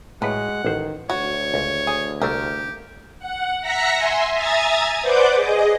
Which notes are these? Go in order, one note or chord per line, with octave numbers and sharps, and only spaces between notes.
A2 F#3 G#3 B4 F#5
A1 D#3 C5
D2 F#4 C#5
C#2
G#4
C2 A3 A#3 G4 A#4
F#5
E5 F#5 A#5 A#6 B6 C#7
E5 G#5 C6
E5 G#5 A#5 D#6 G#6 A6
B4 C5 D5 F#5 D6 G6
G#4 D#5